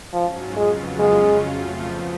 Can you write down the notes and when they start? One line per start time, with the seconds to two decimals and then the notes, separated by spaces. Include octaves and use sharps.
0.13 G#2 F3 F#3 C#4 F4
0.56 F2 C#3 F#3 G#3 B3 F4
0.99 C#3 F#3 G#3 C#4 F4
1.42 F2 F3 A3 F4
1.85 F2 F3 B3